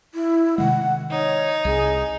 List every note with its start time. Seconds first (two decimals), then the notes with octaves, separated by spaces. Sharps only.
0.15 E4
0.58 C3 D#3 G#3 F#5
1.11 D#4 C#5
1.65 C2 G#4